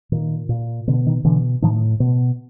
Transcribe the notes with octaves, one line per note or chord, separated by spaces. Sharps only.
A#2 D#3
A#2
B2 D3
D#3
B2 D3 E3
A2 D#3 F3
B2